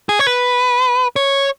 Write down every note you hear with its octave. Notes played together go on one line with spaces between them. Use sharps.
G#4
C#5
B4
C#5